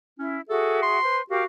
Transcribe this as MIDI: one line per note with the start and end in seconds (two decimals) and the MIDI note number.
0.19 0.38 61
0.19 0.40 64
0.49 1.02 66
0.49 1.02 68
0.49 0.80 69
0.49 1.02 76
0.83 1.20 84
1.03 1.22 71
1.03 1.22 72
1.30 1.46 66
1.30 1.44 67
1.30 1.44 70
1.30 1.44 77